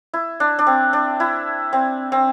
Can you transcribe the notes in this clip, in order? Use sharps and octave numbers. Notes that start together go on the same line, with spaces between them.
E4
D4
D4
C4
D4
E4
C4
C4